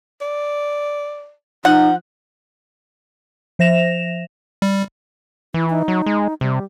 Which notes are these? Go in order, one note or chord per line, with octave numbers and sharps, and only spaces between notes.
D5
F3 D#4 F#5
F3 C5 E5 A#6 E7 F7
G3
E3 E4
D#4
F#3
G#3
C3 G3